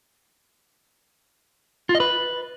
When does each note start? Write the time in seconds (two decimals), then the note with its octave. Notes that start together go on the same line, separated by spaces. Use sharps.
1.89 F4
1.95 D#5
2.00 B4